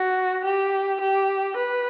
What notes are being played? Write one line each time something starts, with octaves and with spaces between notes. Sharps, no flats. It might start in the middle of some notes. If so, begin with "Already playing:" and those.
Already playing: F#4
G4
G4
B4